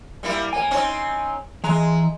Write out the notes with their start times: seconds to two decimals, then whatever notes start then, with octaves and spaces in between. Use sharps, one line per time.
0.23 G3 A#3 E4
0.53 A#3 C#5 G#5
0.71 C4 C#4 D#4
1.64 E3 G#3 A#5